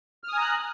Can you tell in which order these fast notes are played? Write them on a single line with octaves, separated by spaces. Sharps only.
F6 D#6 G#5 A#5 F#6